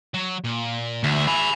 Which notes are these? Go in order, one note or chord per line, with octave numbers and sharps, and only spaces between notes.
F#3
A#2
D2 G#4 E5
G#5 B5